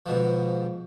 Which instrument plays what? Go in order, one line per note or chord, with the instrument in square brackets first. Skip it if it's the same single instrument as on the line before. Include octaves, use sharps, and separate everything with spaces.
[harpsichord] G#2 B2 D3 F3